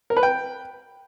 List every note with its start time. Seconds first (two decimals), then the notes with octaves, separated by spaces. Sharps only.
0.10 A#4
0.17 B4
0.23 G5